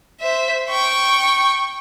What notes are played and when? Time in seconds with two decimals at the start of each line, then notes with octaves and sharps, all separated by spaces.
0.20 C5 E5
0.70 G5 C#6